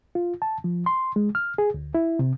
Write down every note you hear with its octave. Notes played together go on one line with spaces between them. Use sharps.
F4
A5
F3
C6
G#3
F6
G#4
D2
E4
C3